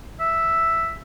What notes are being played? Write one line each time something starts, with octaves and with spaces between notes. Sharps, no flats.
E5